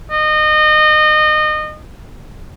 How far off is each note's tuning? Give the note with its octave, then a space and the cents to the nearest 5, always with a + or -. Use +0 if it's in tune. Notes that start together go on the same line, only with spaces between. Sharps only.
D#5 -25